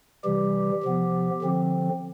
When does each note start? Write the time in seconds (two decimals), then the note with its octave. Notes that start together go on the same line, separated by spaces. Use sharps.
0.24 C3 E3 G3 G4
0.83 C3 F3 B3
1.42 D3 F3 C4